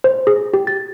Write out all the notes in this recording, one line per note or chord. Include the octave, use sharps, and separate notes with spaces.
C5
G#4
G4
A6